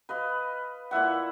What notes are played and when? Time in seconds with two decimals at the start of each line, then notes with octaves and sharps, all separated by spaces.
0.09 B4 D#5 F5
0.91 A#2 E4 E5 F#5